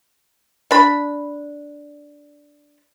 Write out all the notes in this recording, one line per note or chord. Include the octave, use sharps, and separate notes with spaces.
D4 B5